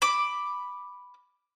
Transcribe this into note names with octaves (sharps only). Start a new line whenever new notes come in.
B5 D6